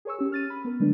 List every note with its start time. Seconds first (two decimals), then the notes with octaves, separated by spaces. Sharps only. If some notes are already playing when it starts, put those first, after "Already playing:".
0.05 G#4 A#4 C#5 G#5 C#6 E6
0.19 C#4 G4
0.32 F6 A6 D#7
0.50 B5
0.65 B3 A#4
0.80 D3 F#3 G#3 A3 D4 B4